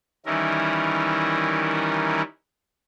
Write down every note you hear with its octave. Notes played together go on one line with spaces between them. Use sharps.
D#3 E3 G3 C#4 E4 A#4